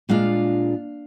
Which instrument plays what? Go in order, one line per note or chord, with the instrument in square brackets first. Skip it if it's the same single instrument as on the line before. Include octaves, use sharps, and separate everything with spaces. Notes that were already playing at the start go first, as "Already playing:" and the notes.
[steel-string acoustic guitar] A#2 G#3 D4 F4 F5